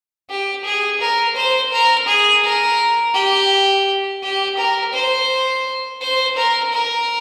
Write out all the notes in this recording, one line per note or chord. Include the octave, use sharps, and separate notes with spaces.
G4
G#4
A#4
C5
A#4
G#4
A#4
G4
G4
A#4
C5
C5
A#4
A#4